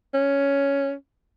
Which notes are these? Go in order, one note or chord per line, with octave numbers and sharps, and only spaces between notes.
C#4